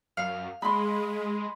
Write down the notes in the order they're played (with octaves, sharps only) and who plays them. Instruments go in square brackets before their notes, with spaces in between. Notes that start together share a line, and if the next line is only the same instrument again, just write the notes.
[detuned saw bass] F#2 [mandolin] F5
[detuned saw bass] G#3 [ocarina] G#4 [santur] B5 C6